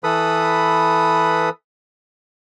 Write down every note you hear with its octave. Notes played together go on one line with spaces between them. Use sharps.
E3 A4 B4 B5 D#6